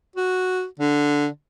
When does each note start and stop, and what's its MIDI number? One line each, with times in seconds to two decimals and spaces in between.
0.16 0.65 66
0.80 1.27 50